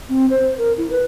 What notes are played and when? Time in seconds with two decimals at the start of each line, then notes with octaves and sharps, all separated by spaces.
0.09 C4
0.30 C5
0.58 A#4
0.78 E4
0.91 B4